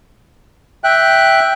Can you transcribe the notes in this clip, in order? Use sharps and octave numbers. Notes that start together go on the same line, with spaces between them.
E5 G5 F#6